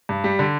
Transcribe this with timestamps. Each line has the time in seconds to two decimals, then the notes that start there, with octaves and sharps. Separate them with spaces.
0.09 G2
0.24 G3
0.39 D3